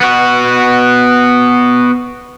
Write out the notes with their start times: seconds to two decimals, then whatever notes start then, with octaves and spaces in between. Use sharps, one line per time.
0.01 B3 F#4